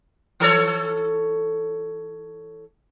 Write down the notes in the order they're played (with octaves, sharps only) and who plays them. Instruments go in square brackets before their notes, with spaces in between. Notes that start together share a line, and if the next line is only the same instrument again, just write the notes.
[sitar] E3 A4 C#5